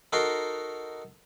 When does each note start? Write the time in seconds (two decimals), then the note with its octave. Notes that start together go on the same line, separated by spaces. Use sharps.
0.13 D#4 F#4 A4 A#4 C6